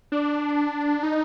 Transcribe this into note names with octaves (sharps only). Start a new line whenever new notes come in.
D4
D#4